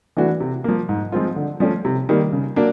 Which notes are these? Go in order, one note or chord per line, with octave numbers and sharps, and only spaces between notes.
E3 A3 D4 F#4
C3
F3 A#3
G#2
F3 G#3 C4 F4
D3
F3 A3 C#4
C3
D#3 G3 A#3
C#3
F#3 A#3 D4